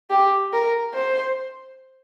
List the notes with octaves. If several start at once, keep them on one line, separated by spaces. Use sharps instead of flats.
G4
A#4
C5